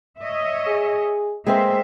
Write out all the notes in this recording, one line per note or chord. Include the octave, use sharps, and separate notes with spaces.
C#5 D#5 E5
G#4
G#3 A#3 C4 C5 E5